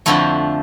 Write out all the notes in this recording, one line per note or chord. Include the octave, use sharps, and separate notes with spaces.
F2 D3 F3 A3 E4